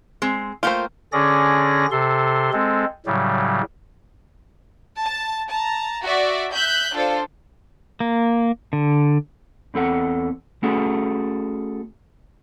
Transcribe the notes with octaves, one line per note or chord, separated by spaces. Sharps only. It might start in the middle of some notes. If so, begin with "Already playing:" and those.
G#3 C4
A3 A#3 F4 C5 G5
D3 C#4 G#4 D5 A#6
C3 A4 C6
G#3 C4 A4
A2 C#3 F#3 G3
A5
A5 A#5
F#4 D5 E5
E5 F#6 G6
D4 F4 A4 C5
A#3
D3
E2 C4 A4 F#5
A3 C#4 F#4 G#4 A4